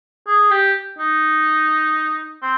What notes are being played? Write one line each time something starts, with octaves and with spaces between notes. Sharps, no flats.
G#4
G4
D#4
C4